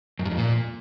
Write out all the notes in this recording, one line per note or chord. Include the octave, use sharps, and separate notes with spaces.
F#2
G2
F2
A#2